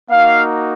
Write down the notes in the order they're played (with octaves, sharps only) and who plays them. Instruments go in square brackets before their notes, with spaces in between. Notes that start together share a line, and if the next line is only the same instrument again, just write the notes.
[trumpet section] A#3 D#4 F#4 F5